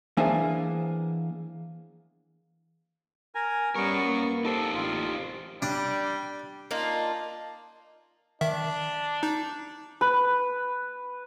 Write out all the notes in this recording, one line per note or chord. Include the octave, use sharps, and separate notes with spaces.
E3 A#3 D4 G#4 C5 G#5
A#4 G#5 A#5
G3 B3 C#4 A#4 C#6
A#3
D#4 G4 A4 C5
A1 F4
G3 D4
A#3 D4 D#4 F4
D#3 D4 E5
D#4
B4